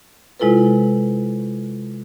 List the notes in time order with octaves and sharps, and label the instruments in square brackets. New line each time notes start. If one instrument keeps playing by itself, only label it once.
[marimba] C3 G#3 E4 F4 A4 B4